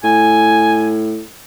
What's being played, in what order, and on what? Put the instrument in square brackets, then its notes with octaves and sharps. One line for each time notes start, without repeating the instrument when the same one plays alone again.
[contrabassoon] A2 [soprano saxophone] G#5